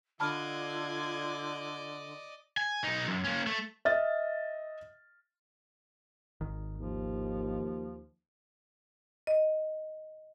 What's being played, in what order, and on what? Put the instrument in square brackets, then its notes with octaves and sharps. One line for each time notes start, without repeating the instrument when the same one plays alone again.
[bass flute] D3 [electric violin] F4 G#6 [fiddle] D5 D#5 [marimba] A5 B5 F6
[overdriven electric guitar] G#5
B1 D#4
F#2
A#3 C#4
A3
[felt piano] D#5 E5 F6 A6
[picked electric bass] G#1 D#3
[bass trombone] D#2 [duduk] F3
[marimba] D#5